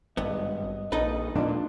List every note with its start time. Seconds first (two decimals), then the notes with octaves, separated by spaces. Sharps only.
0.17 G#1 G2 B3 D#5
0.92 A#1 D#4 A4 B4 D#5
1.35 A#2 D4 F4